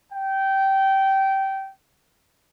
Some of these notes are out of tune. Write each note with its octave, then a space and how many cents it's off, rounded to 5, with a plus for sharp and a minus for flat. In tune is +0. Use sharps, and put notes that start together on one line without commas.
G5 -20